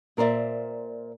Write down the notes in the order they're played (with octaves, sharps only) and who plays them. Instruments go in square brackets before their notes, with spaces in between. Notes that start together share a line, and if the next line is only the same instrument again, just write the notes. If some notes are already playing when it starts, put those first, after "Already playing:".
[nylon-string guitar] A#2 A#4 C5 D5 E5